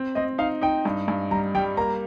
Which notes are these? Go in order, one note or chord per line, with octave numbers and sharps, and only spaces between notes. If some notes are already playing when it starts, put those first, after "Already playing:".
Already playing: C4
C4 D#5
D#4 F5
D#4 G5
G2
G2
G3 A#5
G3 G5
A#3 A#5